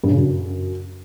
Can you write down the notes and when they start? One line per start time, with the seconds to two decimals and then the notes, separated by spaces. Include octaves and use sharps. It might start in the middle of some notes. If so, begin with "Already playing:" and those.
0.04 G2
0.10 C#3
0.17 F#2